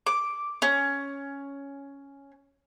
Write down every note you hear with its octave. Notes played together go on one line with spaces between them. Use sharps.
D6
C#4